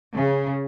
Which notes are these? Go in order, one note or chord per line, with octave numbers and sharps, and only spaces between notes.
C#3